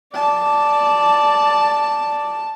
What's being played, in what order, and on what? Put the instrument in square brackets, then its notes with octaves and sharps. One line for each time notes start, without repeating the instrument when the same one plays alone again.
[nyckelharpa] D5 [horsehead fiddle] A5